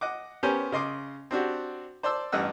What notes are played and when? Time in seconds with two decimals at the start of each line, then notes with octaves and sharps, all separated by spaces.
0.01 D#5 F#5 D6
0.43 B3 C#4 G4 A#4 C5 G#5
0.72 C#3 D#5 C6 D6
1.31 C4 D4 F#4 G4
2.03 C5 D5 A5 C6 E6
2.32 A1 G2 D#5 F#5 E6